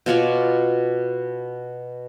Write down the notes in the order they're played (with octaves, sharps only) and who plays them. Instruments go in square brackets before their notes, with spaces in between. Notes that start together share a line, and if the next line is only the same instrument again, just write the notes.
[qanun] B2 F4 C#5 D5